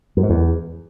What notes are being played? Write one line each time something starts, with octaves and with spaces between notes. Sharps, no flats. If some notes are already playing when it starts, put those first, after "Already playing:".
F#2
G#2
E2